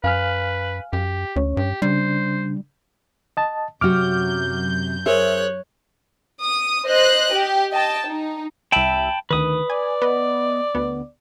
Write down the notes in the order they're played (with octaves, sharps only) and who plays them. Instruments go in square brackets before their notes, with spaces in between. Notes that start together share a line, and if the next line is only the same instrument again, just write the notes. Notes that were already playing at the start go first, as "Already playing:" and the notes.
[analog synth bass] F#2 [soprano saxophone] B4 [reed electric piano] F5 G#5 F6
[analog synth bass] F#2 [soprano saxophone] G4
[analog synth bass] D2 [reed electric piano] C#4 C#5
[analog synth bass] G2 [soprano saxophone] G4
[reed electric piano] C#3 D4 [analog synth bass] G3 [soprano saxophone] C5
[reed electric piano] D#5 A5
[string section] F#2 G6 [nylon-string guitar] C3 F#3 F#4 [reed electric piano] D6 F6
[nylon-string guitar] G#4 A#4 C5 [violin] C#5 F#6 [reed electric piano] E5
[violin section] D#6
C5 D#5 F#6
G4
D#5 G5 A5
D#4
[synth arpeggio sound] C2 E5 [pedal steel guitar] G5 A5 B5
[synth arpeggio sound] D2 D#3 [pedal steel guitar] B4 D#6
[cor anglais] D5 [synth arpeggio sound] G#5
[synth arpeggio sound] B3 D#5
D2 B3